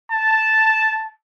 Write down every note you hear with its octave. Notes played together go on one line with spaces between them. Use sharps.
A5